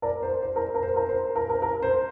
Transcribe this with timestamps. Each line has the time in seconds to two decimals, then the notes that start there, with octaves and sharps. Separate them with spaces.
0.02 A#4 D5
0.23 C5
0.42 C5
0.56 A#4
0.75 A#4
0.83 C5
0.96 A#4
1.09 C5
1.36 A#4
1.49 A#4
1.62 A#4
1.82 C5